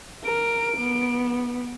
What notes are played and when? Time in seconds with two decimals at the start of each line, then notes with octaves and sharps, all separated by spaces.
0.25 A#4 D7
0.77 B3